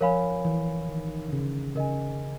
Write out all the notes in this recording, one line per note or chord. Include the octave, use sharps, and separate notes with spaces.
F3 A#4 C#5 F5 G#5 B5
E3
D#3
D3
C#3
C#3 A#4 D#5 G#5